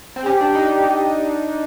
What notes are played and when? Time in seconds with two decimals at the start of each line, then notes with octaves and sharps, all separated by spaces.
0.16 C4
0.25 C#4 G4
0.41 D4
0.55 D#4